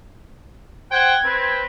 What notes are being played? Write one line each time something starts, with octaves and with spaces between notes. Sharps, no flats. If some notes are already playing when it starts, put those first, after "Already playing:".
C5 F#5 G5 G#6
C4 B4